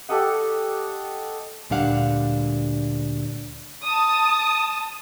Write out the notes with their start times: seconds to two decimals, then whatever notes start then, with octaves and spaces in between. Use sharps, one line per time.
0.09 G4 A4 D#5 F#5
1.70 D2 A#2 G3 D4 F5 F#5
3.82 A5 D#6